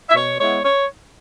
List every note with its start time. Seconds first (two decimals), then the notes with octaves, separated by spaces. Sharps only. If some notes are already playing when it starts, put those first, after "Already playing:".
0.09 E5
0.14 B2 C#5
0.39 G#3 B3 E4 C#5
0.64 C#5